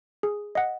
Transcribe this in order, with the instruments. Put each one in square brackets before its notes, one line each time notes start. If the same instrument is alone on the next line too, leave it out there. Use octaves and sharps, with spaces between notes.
[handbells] G#4
D#5 F#5